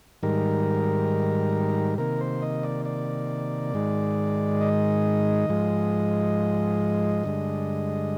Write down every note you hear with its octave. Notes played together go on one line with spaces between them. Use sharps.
G#2 D#3 G3 A#4
C3 D#3 A#3 A#4
C5
D#5
D5
D5
G#2 D#3 G#3
D#5
G#2 F3 G#3
G2 D3 G#3